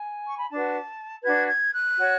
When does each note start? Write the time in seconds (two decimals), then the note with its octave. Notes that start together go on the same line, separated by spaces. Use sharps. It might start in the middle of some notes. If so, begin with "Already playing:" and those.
Already playing: G#5
0.27 C#6
0.39 B5
0.51 D4 F#4 B4 A5
1.23 D4 F#4 B4 G#6
1.48 G#6
1.72 F#6
1.97 F#4 C#5